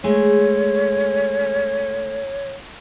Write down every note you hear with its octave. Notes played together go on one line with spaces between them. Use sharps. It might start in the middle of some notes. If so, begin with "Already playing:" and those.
G#3 A3 C#5